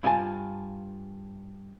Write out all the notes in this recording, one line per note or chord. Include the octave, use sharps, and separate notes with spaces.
G2 E4 F4 G4 G#5 A5